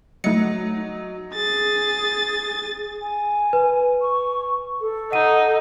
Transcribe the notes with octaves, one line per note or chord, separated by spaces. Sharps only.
F#3 A3 D#4 C#7
G#4 A6
G#5
B4
C#6
A4
D#4 F#5 D#7